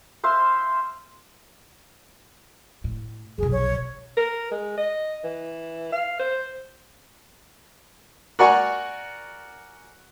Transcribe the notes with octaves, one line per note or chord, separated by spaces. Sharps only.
C5 E5 F5 C6
A2
F1 B1 G#4
C#5
A#4
G#3
D#5
E3
F5
C5
F#4 A#4 D5 F#5 G#5 C#6